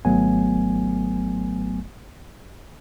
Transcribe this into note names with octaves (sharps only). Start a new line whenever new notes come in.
G#1 F#3 A3 B3 G#5